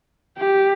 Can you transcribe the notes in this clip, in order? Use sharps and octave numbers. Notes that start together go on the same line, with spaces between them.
G4